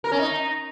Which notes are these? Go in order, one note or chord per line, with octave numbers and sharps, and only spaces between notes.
A#4
C#4
D#4